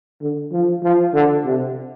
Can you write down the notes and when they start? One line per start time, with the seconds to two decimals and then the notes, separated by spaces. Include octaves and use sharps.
0.21 D3
0.52 F3
0.83 F3
1.14 D3
1.45 C3